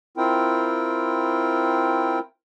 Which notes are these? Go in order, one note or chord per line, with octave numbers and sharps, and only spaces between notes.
C4 E4 F4 A#4 G5